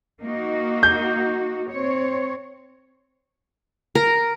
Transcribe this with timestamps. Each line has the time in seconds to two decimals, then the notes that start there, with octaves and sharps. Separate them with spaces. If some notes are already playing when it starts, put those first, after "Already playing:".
0.23 A#3 D#4 F#4
0.83 G6
1.70 C4 C#5
3.95 A#4